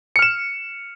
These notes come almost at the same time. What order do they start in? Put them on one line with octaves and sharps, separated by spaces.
C#7 F6 E7